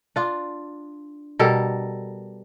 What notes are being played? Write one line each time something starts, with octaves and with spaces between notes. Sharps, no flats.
D4 F4
B2 G3 A4 A#4